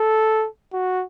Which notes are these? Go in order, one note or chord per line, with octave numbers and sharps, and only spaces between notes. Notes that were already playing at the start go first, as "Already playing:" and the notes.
Already playing: A4
F#4